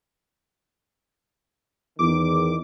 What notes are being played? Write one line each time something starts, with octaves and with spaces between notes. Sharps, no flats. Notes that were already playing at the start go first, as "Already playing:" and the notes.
E2 D#3 D6